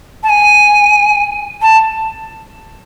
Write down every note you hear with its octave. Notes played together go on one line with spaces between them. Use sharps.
A5
G#5
A5